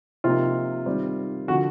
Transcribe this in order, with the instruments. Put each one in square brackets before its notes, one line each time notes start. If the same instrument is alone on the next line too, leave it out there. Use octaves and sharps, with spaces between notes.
[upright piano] C3 F3 A#3 D#4 [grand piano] F4
[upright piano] D#3 G3 C4
[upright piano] D3 F3 [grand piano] F#4